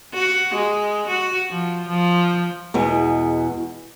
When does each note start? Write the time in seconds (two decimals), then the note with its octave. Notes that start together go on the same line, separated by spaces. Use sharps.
0.14 F#4
0.55 G#3
1.08 F#4
1.50 F3
1.88 F3
2.74 E2 B2 G#3